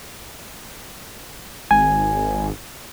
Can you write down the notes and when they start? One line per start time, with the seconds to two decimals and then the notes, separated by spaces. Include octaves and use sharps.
1.71 G#1 G#5